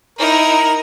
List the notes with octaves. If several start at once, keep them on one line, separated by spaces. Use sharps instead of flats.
D#4 E4 A#4